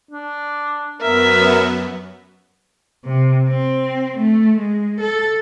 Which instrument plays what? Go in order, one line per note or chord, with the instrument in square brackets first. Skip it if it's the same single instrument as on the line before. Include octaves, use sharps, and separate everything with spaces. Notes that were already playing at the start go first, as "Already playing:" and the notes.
[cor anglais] D4
[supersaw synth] F#2 F#3 B3 [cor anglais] A#4 [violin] E5
[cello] C3
C4
A3
G#3
A4